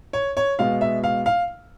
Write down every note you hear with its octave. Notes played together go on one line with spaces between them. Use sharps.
C#5
C#5
B2 G#3 B3 F5
E5
F5
F5